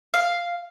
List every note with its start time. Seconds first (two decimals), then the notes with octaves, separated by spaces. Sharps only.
0.14 F5